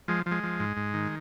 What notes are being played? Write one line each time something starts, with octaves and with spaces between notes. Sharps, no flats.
F3 G#3
F3
G#3
F3
G#2
G#2
D#3